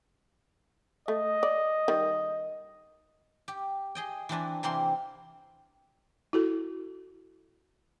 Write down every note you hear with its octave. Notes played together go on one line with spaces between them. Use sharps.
A3 D#5
D5
D#3 G3
G4
G#4 D#5 G5
E3 C4 D4 B4
C3 E3 A#3 C4 G4 C6
E4 F#4 A4